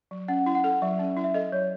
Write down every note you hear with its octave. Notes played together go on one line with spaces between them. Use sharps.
F#3
C#4 F#5
E4
F#5
A4
F#3 E5
C#4
E4
E5
A4 D#5
F#3 C#5